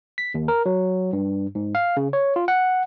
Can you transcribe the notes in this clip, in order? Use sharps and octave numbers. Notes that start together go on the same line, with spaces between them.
B6
D#2
A#4
F#3
G2
G#2
F5
C#3
C#5
F4
F#5